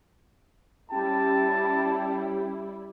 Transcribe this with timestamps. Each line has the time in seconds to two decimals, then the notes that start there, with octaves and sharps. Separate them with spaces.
0.91 G3 C#4 E4 G4 G5 A5